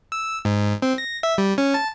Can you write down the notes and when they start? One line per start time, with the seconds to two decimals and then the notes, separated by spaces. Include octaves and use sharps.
0.12 E6
0.45 G#2
0.82 C4
0.98 A#6
1.23 E5
1.38 G3
1.58 C#4
1.74 A5